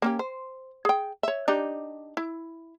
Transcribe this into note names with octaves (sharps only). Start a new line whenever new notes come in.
A#3 C#4 G4
C5
G#4 G5
C#5 E5
D4 D#4 G4
E4